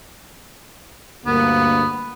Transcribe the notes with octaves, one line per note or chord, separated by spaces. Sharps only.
D2 G2 A#3 B3